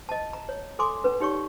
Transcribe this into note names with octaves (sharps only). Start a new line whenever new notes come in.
D#5 A5
A#5
C#5
A4 G#5 C6 D6
C#4 B4
D#4 G4 C#5 D5 C#6